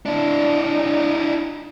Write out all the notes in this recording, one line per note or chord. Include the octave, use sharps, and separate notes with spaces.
D4 E4